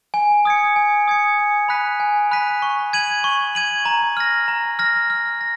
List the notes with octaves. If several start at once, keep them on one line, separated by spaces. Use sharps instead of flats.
G#5
D#6 G#6 C#7
G#5
D#6 G#6 C#7
G#5
B5 F#6 B6 D#7
G#5
B5 F#6 B6 D#7
C#6
G#6 D#7 F#7
C#6
G#6 D#7 F#7
A#5
F6 A#6
A#5
F6 A#6
F6
A#6